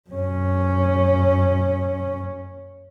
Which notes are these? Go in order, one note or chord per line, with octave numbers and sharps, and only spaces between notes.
F#2 C#4